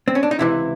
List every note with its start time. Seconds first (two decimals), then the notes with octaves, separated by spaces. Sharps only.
0.08 C4
0.15 C#4
0.23 D4
0.31 D#4
0.39 C#2 C3 E3 E4